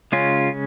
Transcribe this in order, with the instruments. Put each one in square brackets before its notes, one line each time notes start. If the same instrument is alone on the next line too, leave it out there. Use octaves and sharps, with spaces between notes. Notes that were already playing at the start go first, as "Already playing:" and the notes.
[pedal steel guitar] C#3 G#3 C#4 F4